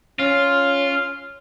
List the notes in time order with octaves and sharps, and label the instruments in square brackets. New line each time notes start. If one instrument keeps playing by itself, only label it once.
[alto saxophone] C#4 [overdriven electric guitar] F4